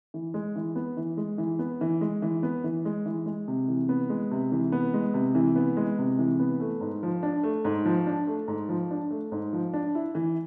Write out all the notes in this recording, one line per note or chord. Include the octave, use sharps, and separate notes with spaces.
E3
G#3
E3
B3
E3
G#3
E3
B3
E3
G#3
E3
B3
E3
G#3
E3
G#3
C3
E3
B3
G#3
C3
E3
B3
G#3
C3
E3
B3
G#3
C3
E3
B3
A3
G#2
F3
D4
A3
G#2
F3
D4
A3
G#2
F3
D4
A3
G#2
F3
D4
E4
E3